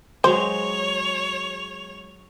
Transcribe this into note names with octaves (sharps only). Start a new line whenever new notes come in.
F#3 G#3 C5 C#5 F7